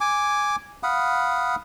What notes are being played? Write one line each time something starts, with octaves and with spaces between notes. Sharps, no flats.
G#5 D6
F5 F#5 B5 D#6